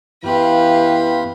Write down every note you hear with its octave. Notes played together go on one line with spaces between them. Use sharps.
F#2 E3 B3 G4 B4 F5 C6